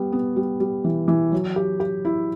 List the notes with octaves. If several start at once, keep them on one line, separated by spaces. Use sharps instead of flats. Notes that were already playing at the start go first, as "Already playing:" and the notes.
Already playing: G3 B3
B3
G3
G3
E3
E3
F#3
G4
G4
E4